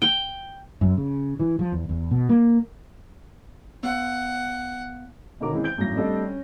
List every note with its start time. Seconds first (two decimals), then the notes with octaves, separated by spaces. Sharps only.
0.02 G5
0.81 F#2
0.97 C#3
1.39 E3
1.59 F3
1.72 E2
1.89 E2
2.11 B2
2.29 A#3
3.83 B3 F#5
5.40 B2 D3 D#3 C#4 A#4 D6
5.51 E3 G#3 C4
5.64 C5 G6 D7 G7
5.77 G#1 F#2 A2 A#6
5.96 G3 A3 C4 D4 A4 D#5
6.25 C#4